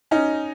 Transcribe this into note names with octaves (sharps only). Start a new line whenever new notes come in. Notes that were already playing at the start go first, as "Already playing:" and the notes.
C#4 D#4